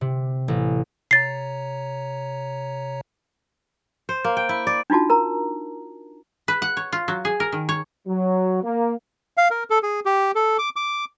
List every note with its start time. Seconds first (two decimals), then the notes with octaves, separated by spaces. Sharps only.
0.01 C3
0.48 A1
1.11 C3 C#5 A#5 A6 C7
4.09 C5
4.25 A#3
4.37 G5
4.49 E4
4.67 D5
4.90 D4 D#4 F4 F#4 A5
5.10 A#4 A#5
6.48 B4
6.62 F#5
6.77 C#5
6.92 F4
7.08 F#3
7.25 G#4
7.40 A#4
7.52 D#3
7.69 C#5
8.07 F#3
8.63 A#3
9.37 F5
9.51 A#4
9.70 A4
9.83 G#4
10.05 G4
10.35 A4
10.58 D6
10.76 D6